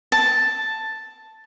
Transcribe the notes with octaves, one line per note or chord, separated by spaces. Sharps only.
A5